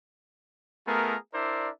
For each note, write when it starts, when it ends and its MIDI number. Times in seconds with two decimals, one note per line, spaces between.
0.87 1.17 57
0.87 1.17 59
0.87 1.17 65
0.87 1.17 68
0.87 1.17 70
1.34 1.70 62
1.34 1.70 64
1.34 1.70 70
1.34 1.70 72
1.34 1.70 74
1.34 1.70 76